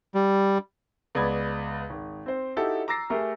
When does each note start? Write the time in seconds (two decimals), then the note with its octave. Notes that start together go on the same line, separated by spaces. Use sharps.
0.15 G3
1.15 C#2 B3 D5 B5 D#6 G#6
1.90 G#1
2.26 C4 C5
2.56 D#4 E4 F#4 G4 A4
2.88 A#5 D6 E6 A6 A#6 C7
3.10 A3 G4 G#4 A#4